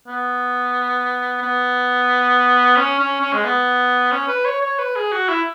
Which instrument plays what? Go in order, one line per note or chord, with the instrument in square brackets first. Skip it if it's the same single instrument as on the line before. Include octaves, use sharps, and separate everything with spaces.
[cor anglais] B3
B3
C#4
C#4
C#4
G#3
B3
C#4
B4
C#5
C#5
B4
G#4
F#4
E4